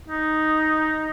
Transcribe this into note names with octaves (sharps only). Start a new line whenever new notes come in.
D#4